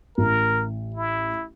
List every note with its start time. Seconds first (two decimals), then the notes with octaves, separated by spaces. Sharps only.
0.18 A1 A#4
0.95 E4